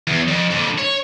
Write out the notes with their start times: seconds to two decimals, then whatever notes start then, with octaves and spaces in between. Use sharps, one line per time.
0.07 E2
0.28 F2
0.51 F2 D3
0.78 C#5